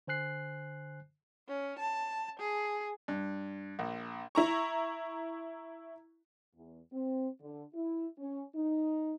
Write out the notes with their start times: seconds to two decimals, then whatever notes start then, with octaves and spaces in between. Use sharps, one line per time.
0.07 D3 C5 G#5 F#6 C7
1.48 C#4
1.79 A5
2.39 G#4
3.08 G2
3.79 A#1
4.35 E4 A#5 C#6
6.55 E2
6.92 C4
7.41 D3
7.74 E4
8.18 C#4
8.55 D#4